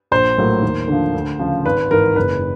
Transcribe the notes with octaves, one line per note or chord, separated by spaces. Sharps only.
A#1 C5
A2 F#3 A#3
D#2
D3 F3
D2
C#3 F3
G#1 B4
G#2 E3 A#4
F#1 B4